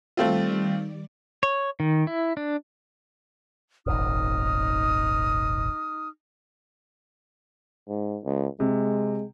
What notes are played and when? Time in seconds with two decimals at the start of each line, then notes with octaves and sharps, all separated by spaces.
0.17 D#3 G3 A3 C4 F4 D5
1.43 C#5
1.80 D#3
2.07 E4
2.37 D4
3.86 D#1 G#1 D#4 D#6 F6
7.89 G#2
8.24 C#2
8.60 C3 G#3